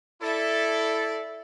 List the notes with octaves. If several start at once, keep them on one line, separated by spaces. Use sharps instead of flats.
E4 A4 D5 E5